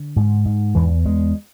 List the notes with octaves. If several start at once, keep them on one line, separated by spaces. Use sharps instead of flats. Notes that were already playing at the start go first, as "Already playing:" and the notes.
Already playing: D3
G#2
G#2
E2 E3
E2 G#3